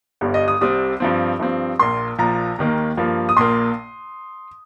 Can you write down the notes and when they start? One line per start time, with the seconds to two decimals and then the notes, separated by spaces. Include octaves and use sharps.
0.21 G1 G2 G3
0.34 D#5
0.48 D#6
0.61 C2 C3 G3 C4 D#6
1.00 G2 F3 C4
1.40 G2 F3 C4
1.79 A#1 A#2 A#3 C6
2.18 A#1 A#2 F3 A#5
2.59 D#2 D#3 A#3
2.97 G2 F3 A#3
3.29 D#6
3.37 A#1 A#2 A#3 C6